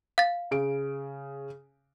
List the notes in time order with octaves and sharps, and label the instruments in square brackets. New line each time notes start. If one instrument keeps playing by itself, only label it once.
[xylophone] F5 A6
[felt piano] C#3 D7